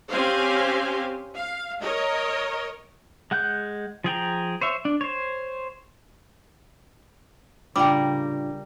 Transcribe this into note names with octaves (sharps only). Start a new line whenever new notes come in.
C4 C#4 G4 C5 F5 G#5
F5
A#4 C#5 D#5
G#3 F#5 F#6 G6
F3 G#4 G5 A#5
C5 C#5 E5
D4
C5 C#5
A2 C#3 G3 D4 F4 A#4 G5 D6